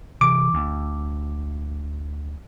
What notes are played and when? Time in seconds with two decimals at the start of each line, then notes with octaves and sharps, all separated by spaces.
0.21 C3 E3 D6
0.54 D2